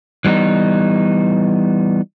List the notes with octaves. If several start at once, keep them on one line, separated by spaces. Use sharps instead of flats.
E3 G3 B3 D#4